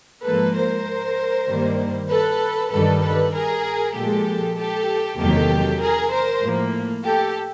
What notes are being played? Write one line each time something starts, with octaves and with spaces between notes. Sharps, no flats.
G#2 F3 A#3 A4 B4
A#4 C5
G2 D#3 G3 A#3
A4 B4
G2 D#3 G3 A4 B4
A4 B4
G#4 A#4
A#2 F3 G#3 G4 A4
G4 A4
E2 C3 D#3 F#3 A#3 G4 A4
G#4 A#4
A#4 C5
A2 F3 A#3
G4 A4